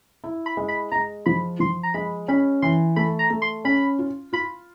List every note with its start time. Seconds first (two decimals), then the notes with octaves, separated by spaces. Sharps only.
0.24 E4
0.46 B5
0.57 G#3
0.68 B5
0.92 G#3 A#5
1.26 F3 B5
1.60 F3 C6
1.83 A#5
1.94 G#3 B5
2.28 C#4 B5
2.62 E3 C6
2.96 A3 B5
3.19 A#5
3.30 A3
3.42 C6
3.65 C#4 B5
3.99 F4
4.33 F4 B5